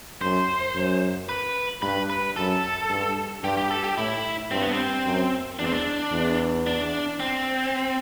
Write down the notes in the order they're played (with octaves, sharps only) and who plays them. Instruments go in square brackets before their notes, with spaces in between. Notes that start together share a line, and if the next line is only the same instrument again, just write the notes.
[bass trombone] F#2 [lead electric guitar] C5
[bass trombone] F#2
[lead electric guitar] B4
[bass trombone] G2 [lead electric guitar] B4
[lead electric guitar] B4
[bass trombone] F#2 [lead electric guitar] A4
[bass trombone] G2
[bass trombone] G2 [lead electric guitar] G4
[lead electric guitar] G4
A4
G4
[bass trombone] A2 [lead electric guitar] E4
[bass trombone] G2 [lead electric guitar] C4
[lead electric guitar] B3
C4
[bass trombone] F#2
[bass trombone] E2 [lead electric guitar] D4
[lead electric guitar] C4
D4
[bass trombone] E2
[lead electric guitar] D4
C4